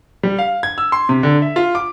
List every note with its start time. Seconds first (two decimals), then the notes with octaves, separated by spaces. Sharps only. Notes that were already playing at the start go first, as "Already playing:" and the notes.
0.23 G3
0.39 F5
0.63 G#6
0.78 E6
0.92 C6
1.09 C3
1.23 D3
1.42 E5
1.56 F4
1.75 D6